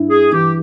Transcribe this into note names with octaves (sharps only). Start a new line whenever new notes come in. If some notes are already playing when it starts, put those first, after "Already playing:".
Already playing: G2 E4
G#4
E3 G4